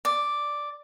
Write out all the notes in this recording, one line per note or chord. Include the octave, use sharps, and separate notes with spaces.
D5